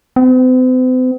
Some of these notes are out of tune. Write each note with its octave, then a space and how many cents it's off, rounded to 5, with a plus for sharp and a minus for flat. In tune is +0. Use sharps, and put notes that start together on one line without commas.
C4 -45